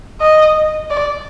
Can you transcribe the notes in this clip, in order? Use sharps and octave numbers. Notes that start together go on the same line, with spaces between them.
D#5
D5